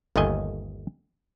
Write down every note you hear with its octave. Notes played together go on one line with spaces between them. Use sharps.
G1 D#2 D#3 A3 D#5 G#5